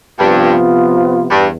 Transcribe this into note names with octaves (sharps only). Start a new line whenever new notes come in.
G2 C3 F3 B3 F4
E2 G2